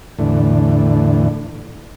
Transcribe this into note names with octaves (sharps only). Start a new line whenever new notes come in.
E2 A2 D3